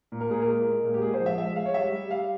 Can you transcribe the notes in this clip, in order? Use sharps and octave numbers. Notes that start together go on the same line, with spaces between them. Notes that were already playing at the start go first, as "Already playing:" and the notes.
A#2
A#4
A#2 G#4
A#4
G#3
G#3
A#2
G4
G#3 G#4
C5
F3
E5
G#3 E5
G#3 F5
C#5
G3 E5
G3
G3 F5